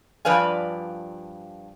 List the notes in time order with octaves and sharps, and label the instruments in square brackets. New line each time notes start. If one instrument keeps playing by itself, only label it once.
[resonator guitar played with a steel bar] G2 F3 B4 D5 F5 G#5